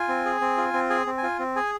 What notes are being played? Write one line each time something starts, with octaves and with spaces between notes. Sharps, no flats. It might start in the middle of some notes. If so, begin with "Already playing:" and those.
Already playing: F4 G#5
C4
G#4
C4
F4
C4
G#4 G#5
C4
G#5
F4
C4
G#4 G#5